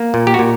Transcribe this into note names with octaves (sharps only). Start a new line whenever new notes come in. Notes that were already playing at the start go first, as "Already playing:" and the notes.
Already playing: A#3
A#2
G4
F#4
A#2